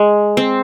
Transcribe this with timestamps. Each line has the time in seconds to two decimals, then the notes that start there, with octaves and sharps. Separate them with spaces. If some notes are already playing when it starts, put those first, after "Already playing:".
Already playing: G#3
0.37 C4